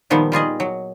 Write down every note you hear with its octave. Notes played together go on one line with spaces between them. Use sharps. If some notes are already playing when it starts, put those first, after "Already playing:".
A#2 D#3 F3 G3 B3
G3 F4 G#4 D#5
F#3